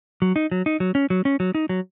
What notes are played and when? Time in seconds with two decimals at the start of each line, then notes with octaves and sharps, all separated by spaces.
0.22 F#3
0.36 D#4
0.52 F#3
0.66 D#4
0.80 F#3
0.95 C#4
1.10 F#3
1.25 C#4
1.40 F#3
1.55 D#4
1.69 F#3